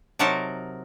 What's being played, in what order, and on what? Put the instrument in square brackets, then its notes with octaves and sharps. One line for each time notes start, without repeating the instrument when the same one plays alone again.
[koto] C3 F#3 D#4 F#4 A#4 A5